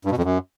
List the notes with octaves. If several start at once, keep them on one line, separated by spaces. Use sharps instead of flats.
G2
B2
F2
F#2